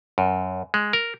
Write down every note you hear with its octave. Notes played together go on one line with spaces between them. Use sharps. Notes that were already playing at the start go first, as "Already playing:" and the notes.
F#2
G#3
A#4